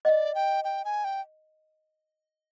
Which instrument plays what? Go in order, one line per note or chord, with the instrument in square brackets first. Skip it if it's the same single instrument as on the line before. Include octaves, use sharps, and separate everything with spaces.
[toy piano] D#5 [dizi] F#5
[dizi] D5
G5
G5
G#5
G5